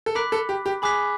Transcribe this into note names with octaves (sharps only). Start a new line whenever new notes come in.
A4
A#4 B5 D6 F#6 B6
A4
G4
G4
G#4 B5 D6 F#6 B6